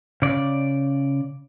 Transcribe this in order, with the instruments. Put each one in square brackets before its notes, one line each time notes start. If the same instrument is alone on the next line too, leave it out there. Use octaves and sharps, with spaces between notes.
[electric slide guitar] C#3 D5